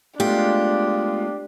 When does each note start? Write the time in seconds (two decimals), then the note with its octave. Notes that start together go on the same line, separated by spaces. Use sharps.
0.20 G#3 A3 B3 D4 F4 G4